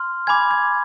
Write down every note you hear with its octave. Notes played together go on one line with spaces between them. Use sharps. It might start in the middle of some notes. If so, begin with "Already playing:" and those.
Already playing: C6 F6
G#5 B5 D6 G#6
G#6